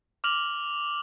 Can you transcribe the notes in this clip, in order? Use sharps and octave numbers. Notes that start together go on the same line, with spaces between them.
D6 F6 F7 F#7